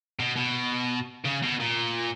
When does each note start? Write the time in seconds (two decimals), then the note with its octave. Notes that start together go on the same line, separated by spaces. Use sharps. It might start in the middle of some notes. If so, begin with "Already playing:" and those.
0.19 B2
0.36 B2
1.25 C#3
1.43 B2
1.60 A#2